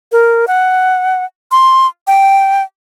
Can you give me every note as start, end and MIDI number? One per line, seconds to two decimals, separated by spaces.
0.12 0.45 70
0.47 1.24 78
1.51 1.87 84
2.07 2.62 79